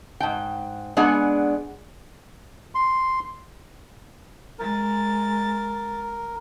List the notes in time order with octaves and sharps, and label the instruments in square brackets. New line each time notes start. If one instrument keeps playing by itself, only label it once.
[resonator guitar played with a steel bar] G#2 G5
G#3 B3 D4 G#4 F#5
[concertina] C6
[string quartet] G#3 A6 [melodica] A#4